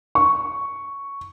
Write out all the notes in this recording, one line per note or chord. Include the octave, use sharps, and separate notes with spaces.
C#6